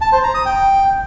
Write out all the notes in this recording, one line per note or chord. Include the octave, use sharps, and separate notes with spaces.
A5
C5
A#5
D#6
G5